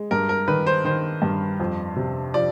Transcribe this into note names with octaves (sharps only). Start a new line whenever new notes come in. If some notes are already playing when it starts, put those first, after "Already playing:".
Already playing: G#3
G2 A#4
A#4
D#3 B4
C5
D#3 C5
G2
F2
C3
F3 D5